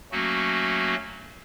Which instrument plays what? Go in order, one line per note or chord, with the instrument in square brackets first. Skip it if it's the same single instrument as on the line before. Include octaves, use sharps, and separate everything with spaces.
[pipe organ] F#3 A3 A#3 C#4 F#4